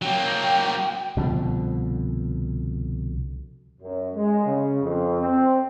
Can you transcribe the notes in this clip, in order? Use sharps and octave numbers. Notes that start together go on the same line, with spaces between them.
F#3 A#3 G5
C2 B2 D3 F3
F#2
G#3
C#3
F2
C4